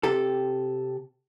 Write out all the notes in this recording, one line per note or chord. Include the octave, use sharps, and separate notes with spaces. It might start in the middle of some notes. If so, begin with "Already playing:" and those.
C3 G4 A4